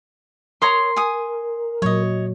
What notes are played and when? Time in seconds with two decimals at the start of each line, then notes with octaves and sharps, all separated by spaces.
0.62 A#4 C#5 A#5 C6 D#6
0.96 G#5 D#6
1.82 A#2 F#3 C#5 D#5